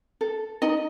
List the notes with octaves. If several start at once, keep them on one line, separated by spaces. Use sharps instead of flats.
A4
D#4 D#5